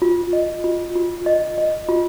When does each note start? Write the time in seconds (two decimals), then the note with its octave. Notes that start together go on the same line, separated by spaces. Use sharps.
0.02 F4
0.33 D#5
0.64 F4
0.95 F4
1.26 D#5
1.58 D#5
1.89 F4